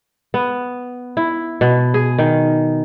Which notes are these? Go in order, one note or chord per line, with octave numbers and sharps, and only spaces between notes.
B3
E4
B2
G#4
D#3